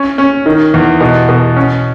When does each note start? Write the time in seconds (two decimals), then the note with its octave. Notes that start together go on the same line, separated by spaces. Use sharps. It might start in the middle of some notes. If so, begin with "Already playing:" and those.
Already playing: C#4
0.18 C#4
0.46 D#3
0.74 E2
1.01 B2
1.29 B2
1.56 C#4